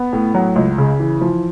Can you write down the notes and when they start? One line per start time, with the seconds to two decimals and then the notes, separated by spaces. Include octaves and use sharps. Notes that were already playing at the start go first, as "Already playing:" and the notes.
Already playing: B3
0.13 A2
0.35 F#3
0.56 C#2
0.78 C#3
1.00 E3
1.21 F3